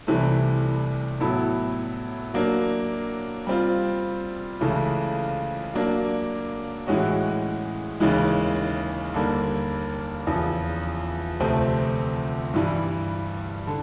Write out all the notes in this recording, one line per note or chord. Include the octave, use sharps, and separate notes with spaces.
C2 C3 E3 A3
A2 F#3 B3 E4 A4
F#3 A#3 D4
G3 C4 F4
C#2 C#3 E3 A3
F#3 A#3 D4
A2 E3 G#3 C#4 F#4
D#2 C#3 E3 G#3
D#2 D3 G3 A#3
E2 C#3 F3
D2 C3 F3 A3 C4
G2 E3 G3
D3